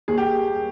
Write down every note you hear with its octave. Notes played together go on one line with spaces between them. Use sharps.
D#2 G#4
G4